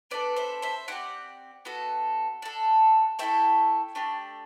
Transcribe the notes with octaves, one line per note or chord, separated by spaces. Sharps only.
B3 D4 A4 B4 D5
C5 E5
C5 E5
C4 E4 G4 D5 F#5
B3 F#4 A4
D4 A4
A3 E4 A4 E5 G5
A3 D4 G4